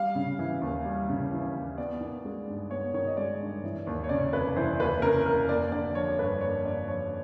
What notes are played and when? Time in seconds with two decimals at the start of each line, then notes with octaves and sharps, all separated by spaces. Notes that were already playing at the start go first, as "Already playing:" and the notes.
Already playing: G3 F5
0.15 C#3
0.39 E3
0.62 D#2
0.85 G3
1.09 C#3
1.32 E3
1.55 D#2
1.78 B3 D5
2.01 D#3
2.25 G#3
2.47 G2
2.71 B3 C#5
2.94 D#3 C#5
3.07 D#5
3.17 G#3 D5
3.40 G2
3.64 E3
3.87 D#2
4.04 C#5
4.09 C#3 D5
4.33 F1 B4
4.56 E3 C5
4.80 D#2 B4
5.02 C#3 A#4
5.25 F1 A#4
5.49 A#3 D5
5.72 D3 D5
5.95 F3 C#5
6.07 C#5
6.18 G2 B4
6.41 A#3 C#5
6.65 D3 D5
6.88 F3 C#5